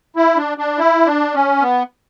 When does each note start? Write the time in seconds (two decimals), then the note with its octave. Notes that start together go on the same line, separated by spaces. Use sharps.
0.16 E4
0.37 D4
0.58 D4
0.79 E4
1.06 D4
1.34 C#4
1.61 B3